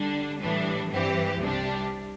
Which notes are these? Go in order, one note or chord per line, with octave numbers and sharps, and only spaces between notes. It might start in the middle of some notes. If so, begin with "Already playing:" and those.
Already playing: D3 G3 D4
A2 E3 G3 D4
G2 E3 G3 C4 G4
C2 C3 G3 D4 G4